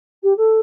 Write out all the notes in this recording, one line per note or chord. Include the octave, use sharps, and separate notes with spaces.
G4
A4